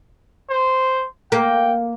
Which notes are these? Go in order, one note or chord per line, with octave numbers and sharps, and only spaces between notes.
C5
A#3 G5